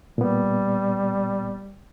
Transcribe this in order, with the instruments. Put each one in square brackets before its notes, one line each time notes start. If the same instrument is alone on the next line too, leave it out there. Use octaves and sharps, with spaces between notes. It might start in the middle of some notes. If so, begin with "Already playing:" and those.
[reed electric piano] A#2 B3 [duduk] G3